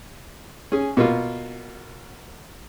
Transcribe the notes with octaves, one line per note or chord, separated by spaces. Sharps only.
C#4 G#4
B2 A#3 F4